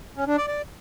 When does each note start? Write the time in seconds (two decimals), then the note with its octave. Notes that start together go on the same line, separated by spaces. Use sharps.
0.17 C#4
0.27 D4
0.37 D5
0.48 D5